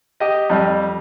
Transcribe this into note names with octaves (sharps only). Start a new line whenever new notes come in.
G4 D#5
F2 G3